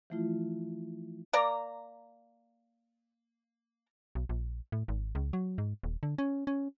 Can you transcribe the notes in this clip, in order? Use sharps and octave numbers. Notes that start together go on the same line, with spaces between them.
E3 F3 A3 E4 F4
A#3 D5 A#5
B1
A#1
A2
G#1
C#2
F#3
G#2
D#1
D3
C#4
C#4